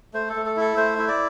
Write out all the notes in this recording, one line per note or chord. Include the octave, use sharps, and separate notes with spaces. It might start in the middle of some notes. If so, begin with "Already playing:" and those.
A3 C5
A4
A3
A4
E4 A4
A3 C5
E4
D5